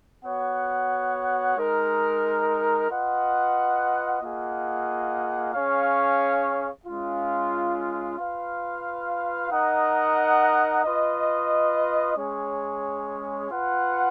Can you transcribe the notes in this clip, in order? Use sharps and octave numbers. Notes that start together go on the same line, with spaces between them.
B3 F#4 C#5 F#5
G#3 D#4 A#4
F4 B4 D#5 F#5
A#3 F4 G#4 D#5 F#5
C#4 G#4 C#5 F5
G#3 C#4 F4
F4 B4 F5
D#4 A#4 D#5 F#5
F4 B4 D#5
G#3 C#4 G#4 C#5
F4 B4 F#5